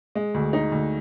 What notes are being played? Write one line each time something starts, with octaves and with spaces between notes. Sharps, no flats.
G#3
D2
D#4
D2